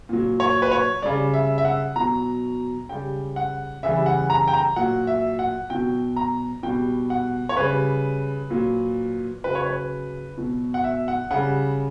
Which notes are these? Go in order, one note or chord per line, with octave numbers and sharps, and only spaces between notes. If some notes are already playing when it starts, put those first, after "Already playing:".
A#2 F#3
C#5
B4
C#5
C#3 G3 D5
E5
E5
F#5
B2 F#3 A#5
C#3 G3 G5
F#5
C#3 E3 G3 E5
F#5
A#5
G5
A#5
A#2 F#3 F#5
E5
F#5
B2 F#3 G5
A#5
B2 G3 G5
F#5
C#5
C#3 G3 B4
A#2 F#3
C#3 F#3 B4
C#5
B4
B2 F#3
F#5
E5
F#5
C#3 G3 F#5